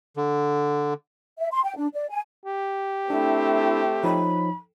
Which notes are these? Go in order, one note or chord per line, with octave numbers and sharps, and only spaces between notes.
D3
E5
C6
G5
D4
D5
G#5
G4
A3 C4 D4 E4
F3 D#4 C#5 B5